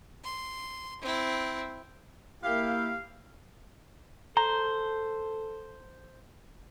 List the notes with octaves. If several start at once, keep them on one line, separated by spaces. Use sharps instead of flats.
C6
C4 E4
A#3 E4 G4 F5
A4 C5 A#5